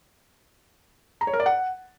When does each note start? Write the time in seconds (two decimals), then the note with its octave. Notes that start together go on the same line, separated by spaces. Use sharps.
1.21 A#5
1.27 C#5
1.33 A#4
1.40 D5
1.46 F#5